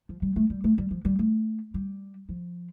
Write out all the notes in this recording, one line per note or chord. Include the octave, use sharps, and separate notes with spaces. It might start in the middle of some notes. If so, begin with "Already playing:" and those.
F3
G3
A3
G3
A3
G3
F3
G3
A3
G3
F3